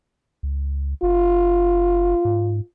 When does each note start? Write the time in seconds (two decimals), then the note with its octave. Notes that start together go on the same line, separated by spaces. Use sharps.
0.43 C#2
1.03 F#1 F4
2.25 G#2